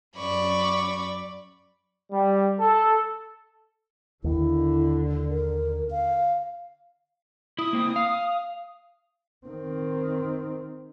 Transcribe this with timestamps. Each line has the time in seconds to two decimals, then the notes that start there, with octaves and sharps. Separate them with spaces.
0.18 F#2 D5 B5 C#6
2.11 G3
2.59 A4
4.24 D#2 D3 D#3 E4
5.29 A#4
5.91 F5
7.59 E4 D#6
7.73 A#3 C4 E4
7.96 F5
9.46 D#3 C4